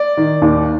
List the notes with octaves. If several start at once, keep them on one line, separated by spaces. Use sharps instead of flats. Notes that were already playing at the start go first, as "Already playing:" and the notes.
Already playing: D5
D#3
D#2